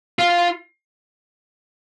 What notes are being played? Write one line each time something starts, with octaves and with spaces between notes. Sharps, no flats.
F4